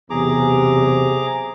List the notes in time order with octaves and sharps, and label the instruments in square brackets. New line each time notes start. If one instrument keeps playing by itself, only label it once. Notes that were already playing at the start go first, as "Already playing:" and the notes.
[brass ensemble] B1 E2 C3 [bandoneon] G#4 A#5 D6